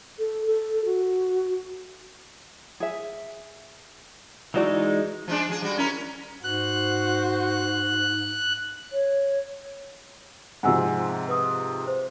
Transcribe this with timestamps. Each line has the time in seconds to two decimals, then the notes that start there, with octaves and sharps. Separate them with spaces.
0.19 A4
0.46 A4
0.85 F#4
2.80 G#4 E5
4.54 E3 G#3 D#4 E4 F#4 D5
5.28 F3 G#3 D4
5.48 F3 G#4
5.62 G3 F#4
5.78 C#4 E4 A#4
6.43 G#2 F#4 C5 F#6
8.93 C#5
10.63 G#2 C3 F3 F#5 G#5 E6
11.28 B4 D#6
11.88 C5